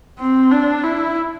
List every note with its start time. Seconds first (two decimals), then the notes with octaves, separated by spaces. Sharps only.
0.19 C4
0.51 D4
0.83 E4